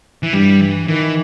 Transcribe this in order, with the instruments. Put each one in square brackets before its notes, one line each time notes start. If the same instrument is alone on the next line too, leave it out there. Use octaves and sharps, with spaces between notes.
[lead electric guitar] E3
[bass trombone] G2 [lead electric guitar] G3
[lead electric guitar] E3
[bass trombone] D#3 [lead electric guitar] E3